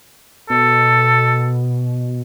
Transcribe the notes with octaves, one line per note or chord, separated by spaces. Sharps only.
B2 A4